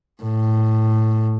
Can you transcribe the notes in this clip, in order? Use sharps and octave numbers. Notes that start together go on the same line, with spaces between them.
A2